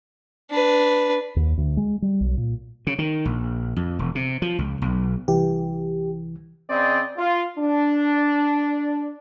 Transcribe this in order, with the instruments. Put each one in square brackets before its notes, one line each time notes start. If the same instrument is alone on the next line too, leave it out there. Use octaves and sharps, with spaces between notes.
[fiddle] D4 B4
[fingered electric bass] D#2
D2
G#3
G3
B1
A#2
[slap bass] C#3
D#3
A#1
F2
E1
C3
F3
C#2
B1
[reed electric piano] C2 E3 [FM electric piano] G4
[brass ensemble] C#3 C4 D5 D#5
F4
D4